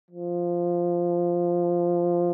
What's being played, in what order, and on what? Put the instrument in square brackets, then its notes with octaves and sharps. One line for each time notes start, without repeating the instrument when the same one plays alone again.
[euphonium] F3